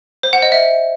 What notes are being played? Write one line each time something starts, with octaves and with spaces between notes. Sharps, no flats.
C5
F#5
D#5
E5